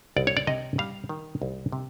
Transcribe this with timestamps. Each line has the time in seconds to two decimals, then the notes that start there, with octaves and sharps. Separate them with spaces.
0.16 C2 D5
0.27 C#5
0.37 D5
0.47 C3 D#5
0.78 G3 F5
1.09 D#3
1.42 C2
1.72 C3